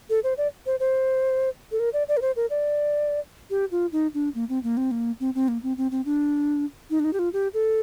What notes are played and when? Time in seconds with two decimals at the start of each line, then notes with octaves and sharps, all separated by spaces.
0.10 A4
0.24 C5
0.38 D5
0.66 C5
0.80 C5
1.72 A4
1.80 A#4
1.93 D5
2.08 D5
2.17 A#4
2.22 C5
2.36 A#4
2.50 D5
3.50 G4
3.71 F4
3.92 D#4
4.14 D4
4.35 A#3
4.49 C4
4.63 A#3
4.77 C4
4.91 A#3
5.20 C4
5.35 C4
5.48 A#3
5.63 C4
5.78 C4
5.91 C4
6.05 D4
6.90 D#4
7.00 D4
7.04 D#4
7.13 G4
7.19 F4
7.33 G4
7.54 A4